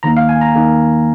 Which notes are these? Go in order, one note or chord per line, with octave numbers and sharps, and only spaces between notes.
D#2 D#3 A#3 A#5
F5
G#5
A#5
D#3 A#3